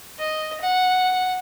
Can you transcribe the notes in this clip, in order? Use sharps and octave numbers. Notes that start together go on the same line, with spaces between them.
D#5
F#5